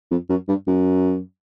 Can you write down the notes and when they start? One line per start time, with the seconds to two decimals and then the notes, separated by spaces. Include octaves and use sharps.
0.11 F2
0.29 F#2
0.48 G2
0.67 F#2